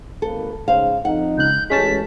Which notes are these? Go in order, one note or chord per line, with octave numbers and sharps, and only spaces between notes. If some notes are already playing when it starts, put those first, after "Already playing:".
G#1 A#3 A4 B4
G#2 C#3 C5 F5
F2 D#4 F#5
C#2 F#6 G6
A1 G#3 C#4 A5 B6